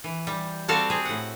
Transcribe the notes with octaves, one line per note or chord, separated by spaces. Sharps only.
E3
G3
G3 C4 F#4 A4 F5 A5
C4 G#4
A2 F#5